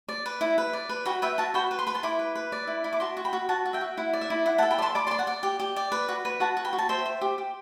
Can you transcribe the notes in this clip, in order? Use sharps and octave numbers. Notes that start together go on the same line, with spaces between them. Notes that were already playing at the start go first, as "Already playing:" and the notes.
D5
B4
E4
B4
D5
B4
F#4 G5 B5
B4 E5 G5
F#4 F#5 A5
F#4 G5 B5
B4
C6
B4 B5
A5 C6
E4 B5 D6
B4
B4
D5
E4
E4
D6
F#4 A5 C6
F#4
G5 B5
F#4
F#4 F#5 A5
F#4
E5 G5
F#4
E4 F#5
D5
E5
E4
E4 F#5
F#5 A5
A4
G5 B5
D5
A5 C6
D5 B5 D6
A5 C6
D5
F#5 A5
D5
G4
G4
D5
B4
F#4
B4
F#4 F#5 A5
F#4
G5 B5
F#4
A5
C5 E5 G5
C5
G4
G4